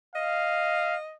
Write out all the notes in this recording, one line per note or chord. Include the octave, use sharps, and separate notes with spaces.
D#5 F5